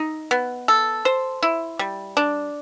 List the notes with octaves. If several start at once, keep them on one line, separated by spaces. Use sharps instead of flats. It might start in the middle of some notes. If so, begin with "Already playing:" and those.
Already playing: D#4
B3
A4
C5
E4
G3
D4